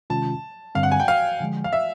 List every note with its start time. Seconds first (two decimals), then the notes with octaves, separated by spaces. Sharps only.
0.10 C3 D#3 G#3 C#4 F4 A5
0.75 G2 D3 G3 C4 F5
0.83 F#5
0.92 G#5
1.00 G5
1.08 F5
1.40 D3 F3 G#3
1.64 F5
1.73 E5